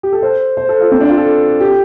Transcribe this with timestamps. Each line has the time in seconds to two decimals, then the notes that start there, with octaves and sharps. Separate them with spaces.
0.03 G4
0.12 A4
0.22 C5
0.57 C5
0.69 A4
0.80 F4
0.92 C4
1.00 D4
1.09 F4
1.17 A4
1.60 G4